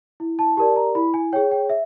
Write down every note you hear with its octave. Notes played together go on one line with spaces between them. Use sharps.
E4
A5
G4 A#4 D5 A5
A#5
E4 B5
G#5
G#4 C#5 G5
G5
E5